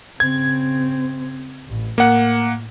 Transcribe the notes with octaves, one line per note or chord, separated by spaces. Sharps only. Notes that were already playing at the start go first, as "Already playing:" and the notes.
C#3 C4 G#6
A1
A2 A#3 F#5